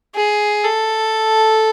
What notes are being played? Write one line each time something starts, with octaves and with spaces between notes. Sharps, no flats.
G#4
A4